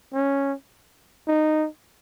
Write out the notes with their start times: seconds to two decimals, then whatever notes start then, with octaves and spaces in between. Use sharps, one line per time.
0.13 C#4
1.27 D#4